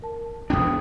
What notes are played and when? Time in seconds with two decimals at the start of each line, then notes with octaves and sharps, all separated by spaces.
0.02 A#4 A5
0.50 E2 B3 D4 G5 D#6